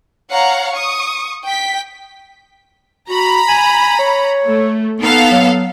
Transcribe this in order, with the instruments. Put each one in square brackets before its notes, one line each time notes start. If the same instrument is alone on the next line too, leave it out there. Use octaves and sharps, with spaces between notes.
[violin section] C#5 F5 F#5 A#5
C#6 D#6
G5 B6
[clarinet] F#4 [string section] A#5 B5
[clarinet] G#5
C#5
[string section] A3
[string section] B3 A4 F5 [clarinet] D#4
[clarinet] F#3